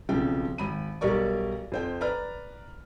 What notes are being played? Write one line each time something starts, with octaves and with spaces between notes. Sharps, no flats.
B1 C#3 F3 C4 G5
G#1 B5 D#7
B1 G3 G4 A#4 D5 C#6
F2 C5 G5
B4 D5 A#5 F6